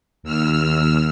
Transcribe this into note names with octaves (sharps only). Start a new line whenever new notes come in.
D#2 E6 F6